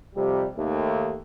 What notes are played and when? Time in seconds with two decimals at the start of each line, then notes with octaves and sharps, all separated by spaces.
0.15 F2 C3 G3
0.57 D#2 A3